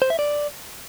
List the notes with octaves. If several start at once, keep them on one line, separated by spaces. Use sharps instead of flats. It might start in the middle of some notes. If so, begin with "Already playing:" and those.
C5
E5
D5